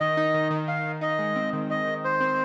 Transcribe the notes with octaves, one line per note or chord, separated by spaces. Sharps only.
D#3 D#5
D#4
D#3
D#3
D#3 F5
D#3
D#4 D#5
G#3
C4
D#3
D#3 D#5
D#3
D#3 C5
C4